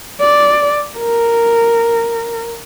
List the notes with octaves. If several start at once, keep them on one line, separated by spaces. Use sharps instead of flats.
D5
A#4